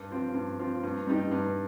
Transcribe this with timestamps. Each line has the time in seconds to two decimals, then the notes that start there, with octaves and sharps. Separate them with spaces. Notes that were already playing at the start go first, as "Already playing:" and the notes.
Already playing: G2
0.11 F3 C4 F4
0.34 G2
0.59 F3 C4 F4
0.83 G2
1.07 G3 D#4 G4
1.31 G2